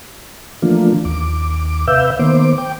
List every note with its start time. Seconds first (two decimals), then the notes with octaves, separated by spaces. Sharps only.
0.62 E3 F3 A3 A#3 D4 F4
1.05 D#2 D6
1.87 C3 B4 E5 F5 E6 G6
2.19 D#3 A#3 B3 C5 D6
2.58 G5 D6